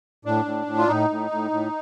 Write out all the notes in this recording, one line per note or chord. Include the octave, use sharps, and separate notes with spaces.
A2 D4
A2
A2
F4
A2 D#4
A2
A2
A2